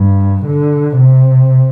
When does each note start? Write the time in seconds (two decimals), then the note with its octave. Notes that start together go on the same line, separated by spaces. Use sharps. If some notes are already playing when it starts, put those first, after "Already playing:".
Already playing: G2
0.46 D3
0.98 C3